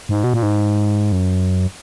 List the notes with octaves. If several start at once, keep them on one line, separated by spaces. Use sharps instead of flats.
G#2
B2
A#2
G#2
F#2